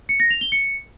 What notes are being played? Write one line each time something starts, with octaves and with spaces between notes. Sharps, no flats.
C#7
A#6
F7
G7
C#7